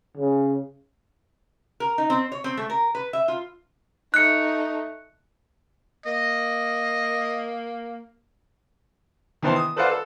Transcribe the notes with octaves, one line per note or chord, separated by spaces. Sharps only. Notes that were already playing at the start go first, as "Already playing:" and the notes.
C#3
A#4
D#4
C4
C#5
C4
A3
A#4
B4
E5
F4
A3 D#4 F#6 C#7
A#3 D#5
D#3 E3 B3 C5 A5 C6
D#6
A4 B4 C5 D5 F5 F#5
A4